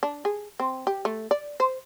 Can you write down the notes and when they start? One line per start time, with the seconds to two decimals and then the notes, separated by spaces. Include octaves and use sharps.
0.03 D4
0.25 G#4
0.60 C4
0.87 G4
1.05 A3
1.31 D5
1.60 C5